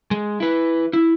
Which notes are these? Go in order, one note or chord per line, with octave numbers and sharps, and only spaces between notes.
G#3
E4 B4
E4